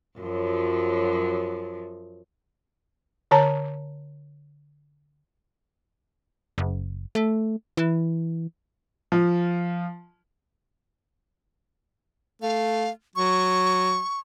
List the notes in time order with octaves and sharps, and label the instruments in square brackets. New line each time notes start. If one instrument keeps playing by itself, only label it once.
[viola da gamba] F#2 F3 F#3
[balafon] D3 C#5 A5 A#5
[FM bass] F#1
A3
E3
[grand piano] F3
[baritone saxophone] A3 [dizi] F5
[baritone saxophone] F#3 [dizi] C#6